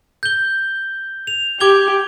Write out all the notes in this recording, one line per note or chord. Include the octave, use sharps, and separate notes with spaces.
G6 G7
F7
G4 D6 G#6 G7